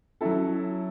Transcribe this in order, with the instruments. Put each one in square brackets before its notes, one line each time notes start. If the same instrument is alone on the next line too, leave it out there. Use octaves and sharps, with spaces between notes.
[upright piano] F#3 C#4 E4 A4